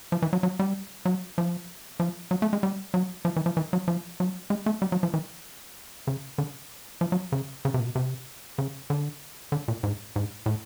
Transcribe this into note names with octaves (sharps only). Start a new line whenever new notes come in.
F3
E3
F#3
F#3
G3
F#3
F3
F3
F#3
A3
G#3
G3
F#3
F3
E3
F3
E3
F#3
F3
F#3
G#3
A3
G3
F#3
F3
E3
C#3
D3
F3
F#3
C#3
C#3
C3
A#2
B2
C3
C#3
D3
D3
A#2
G#2
G#2
A2